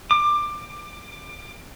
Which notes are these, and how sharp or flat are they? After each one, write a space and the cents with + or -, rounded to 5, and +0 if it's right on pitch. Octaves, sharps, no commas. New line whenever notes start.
D6 +20